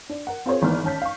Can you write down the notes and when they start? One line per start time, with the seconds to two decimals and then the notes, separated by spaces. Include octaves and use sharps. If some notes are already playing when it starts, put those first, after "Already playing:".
0.09 D4
0.27 A#4 F#5
0.46 C4 F4 G#4 A#4 C5 C#5
0.62 G#1 E3 A#3 B3 D#4 F6
0.84 G#1 C#4 A5 G6 B6
1.02 F5 C#6